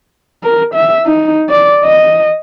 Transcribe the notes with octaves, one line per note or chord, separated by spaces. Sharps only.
A#4
E5
D#4
D5
D#5